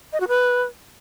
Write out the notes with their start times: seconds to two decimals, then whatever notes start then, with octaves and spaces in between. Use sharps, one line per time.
0.13 D#5
0.20 F#4
0.28 B4